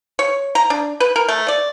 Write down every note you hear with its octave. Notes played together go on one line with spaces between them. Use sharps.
C#5
A#5
D4
B4
A#4
A3
D5